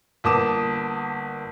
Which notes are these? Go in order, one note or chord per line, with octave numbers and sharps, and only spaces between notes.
G1 A#3 A5 D6 D#6 E7